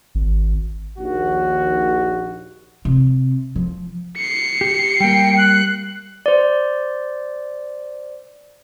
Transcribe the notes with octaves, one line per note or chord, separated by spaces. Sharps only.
G#1
A#1 D#2 F#4
C3
F3
C7 C#7
G4
G3 A#3 G5
F#6
C5 D5